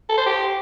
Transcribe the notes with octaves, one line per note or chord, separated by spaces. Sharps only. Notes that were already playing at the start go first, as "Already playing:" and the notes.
A4
C5
G4